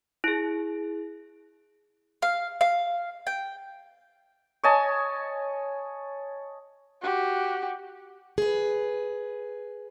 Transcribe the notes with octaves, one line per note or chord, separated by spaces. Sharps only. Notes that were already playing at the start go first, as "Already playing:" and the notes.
E4 G#4
F5
F5
G5
C#5 D#5 G#5 A5
F#4 G4
G#4 B4